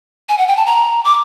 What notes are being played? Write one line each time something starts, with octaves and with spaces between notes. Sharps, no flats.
G#5
F#5
G5
A5
A#5
D6